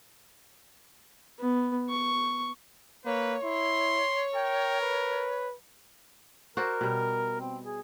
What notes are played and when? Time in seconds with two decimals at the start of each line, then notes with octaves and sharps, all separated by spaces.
1.39 B3
1.89 C#6
3.05 A#3 B4 C#5
3.43 E4 C6
4.35 A#4 G5
4.81 B4
6.57 F#4 A#4 C5 D5
6.81 B2 G3
7.41 C4
7.65 G#4